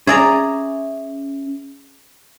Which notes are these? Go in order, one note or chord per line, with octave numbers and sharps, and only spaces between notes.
C#4 G#4 D5 E5 G#5 A#5